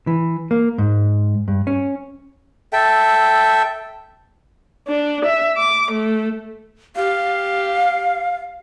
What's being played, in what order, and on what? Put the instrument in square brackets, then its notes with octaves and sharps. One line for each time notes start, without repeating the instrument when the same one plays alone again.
[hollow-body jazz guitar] E3
A#3
G#2
G2
C#4
[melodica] A4 E5 G5
[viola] D4
E5
D6
A3
[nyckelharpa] G4 [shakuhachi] F5